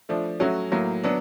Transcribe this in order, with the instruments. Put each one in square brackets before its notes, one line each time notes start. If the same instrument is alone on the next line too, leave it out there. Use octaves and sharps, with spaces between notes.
[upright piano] F3 A3 D4
F#3 A3 C#4 F#4
A2 F#3 A#3
F#3 B3 D4